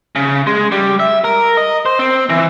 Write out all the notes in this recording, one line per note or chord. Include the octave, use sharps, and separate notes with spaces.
C#3
G#3
G3
E5
A#4
D#5
C5
C4
E3